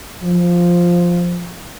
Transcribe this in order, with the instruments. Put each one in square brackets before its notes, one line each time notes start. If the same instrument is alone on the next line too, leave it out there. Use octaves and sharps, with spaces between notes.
[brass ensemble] F3